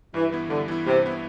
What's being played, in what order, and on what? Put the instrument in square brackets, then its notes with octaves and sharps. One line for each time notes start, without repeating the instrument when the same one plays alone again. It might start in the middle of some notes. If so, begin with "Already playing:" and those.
[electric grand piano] G2 [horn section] E3
[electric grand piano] E3 B3 E4
[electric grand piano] G2 [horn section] D3
[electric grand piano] E3 B3 E4
[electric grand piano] G2 [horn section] C3
[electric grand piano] E3 B3 E4